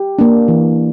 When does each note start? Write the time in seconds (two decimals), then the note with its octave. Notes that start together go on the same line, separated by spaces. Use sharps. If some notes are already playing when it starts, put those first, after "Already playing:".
Already playing: G4
0.19 A#3 D4
0.48 E3